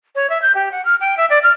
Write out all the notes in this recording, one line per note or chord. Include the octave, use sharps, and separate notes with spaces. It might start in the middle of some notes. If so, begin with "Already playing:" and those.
C#5
E5
G6
G4
F#5
F6
G5
E5
D5
F6